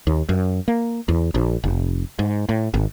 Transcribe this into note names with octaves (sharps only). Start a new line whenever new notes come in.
D#2
F#2
A#3
E2
A#1
F1
G#2
A2
G#1